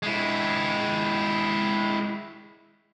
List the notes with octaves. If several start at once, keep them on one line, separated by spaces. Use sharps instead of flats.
G#3 E4